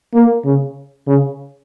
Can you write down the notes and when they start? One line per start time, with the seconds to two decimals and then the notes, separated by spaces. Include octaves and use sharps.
0.14 A#3
0.45 C#3
1.07 C#3